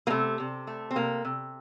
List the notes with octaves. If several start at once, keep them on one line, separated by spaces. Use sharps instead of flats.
A#3
C3 A3
C3
A3
C4
C3 A#3
C3